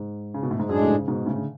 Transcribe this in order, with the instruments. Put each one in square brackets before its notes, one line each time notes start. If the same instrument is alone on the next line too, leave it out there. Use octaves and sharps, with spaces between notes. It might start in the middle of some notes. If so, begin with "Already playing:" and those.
Already playing: [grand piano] G#2
C#3
B2
A2
G#2
[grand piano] F#2 [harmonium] A2 G#3 D4 G#4
[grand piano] F#2
G#2
C#3
G#2 B2
A2 C#3
D3